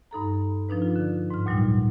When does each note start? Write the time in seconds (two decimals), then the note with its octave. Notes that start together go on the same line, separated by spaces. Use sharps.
0.11 G2 D#4 A4 A#5
0.69 F3 D4 D#4 B4
0.82 F4
0.96 D3
1.30 G#2 F6
1.46 D2 A#2 F#3 G3 D#4